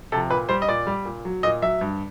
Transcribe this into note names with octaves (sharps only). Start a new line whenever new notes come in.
C3 F3 A4
A#2 B4
G3 C5
D#5
A#2 D5
G3
A#2
F#3
A#2 D#5
F#3 E5
G2